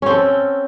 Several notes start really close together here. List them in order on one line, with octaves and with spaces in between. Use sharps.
C#4 C4 A4